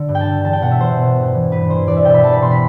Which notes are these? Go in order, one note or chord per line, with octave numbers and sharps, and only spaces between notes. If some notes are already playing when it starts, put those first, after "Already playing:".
Already playing: D3
G2
G5
D3 A5
E2 A5
G5
B2 F#5
E5
E2 C5
B2
G2
E3
G2 B4
E3 C5
E2 D5
E5
B2 G5
B5
E2 A5
B5
B2 C6
B5